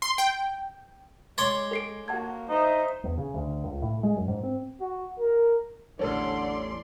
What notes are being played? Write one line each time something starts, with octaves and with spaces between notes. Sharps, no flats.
C6
G5
G#3 C#5 D5 C6
A4 C7 D7
A#3 F#4 F#5 A5 G#6
D#4 C5 E5
E2
C#3
D2
C#2
A2
G#3
F#2
G#2
C4
F#4
A#4
A1 E2 D3 C#4 A4 D5 C6